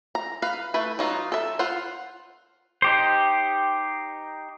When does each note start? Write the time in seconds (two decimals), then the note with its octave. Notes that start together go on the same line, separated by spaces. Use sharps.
0.15 A#5
0.42 B4 F5
0.74 A3 E4 B4
0.99 F#3 D#4 F4
1.32 A4 E5
1.59 F4 C5 F5 F#5
2.82 D#4 G4 C5